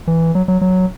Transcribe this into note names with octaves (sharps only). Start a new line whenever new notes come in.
E3
F#3
F#3
F#3